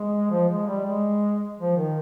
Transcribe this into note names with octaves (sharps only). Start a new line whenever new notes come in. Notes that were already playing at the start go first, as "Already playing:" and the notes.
Already playing: G#3
F3
G#3
G3
G#3
F3
D#3